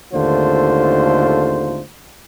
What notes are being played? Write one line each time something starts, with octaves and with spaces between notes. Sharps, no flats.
G#1 D#2 D3 A3 F4 C5